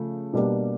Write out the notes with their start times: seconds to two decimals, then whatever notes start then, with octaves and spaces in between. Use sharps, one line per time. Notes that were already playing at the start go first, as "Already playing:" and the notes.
Already playing: C#3 F3 A3
0.33 B2 G3 A#3 D4